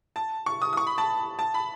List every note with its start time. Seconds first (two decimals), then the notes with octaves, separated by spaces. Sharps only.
0.16 A5
0.46 C#6
0.62 D#6
0.73 D#6
0.77 C#6
0.87 B5
0.98 A5
1.39 A5
1.54 B5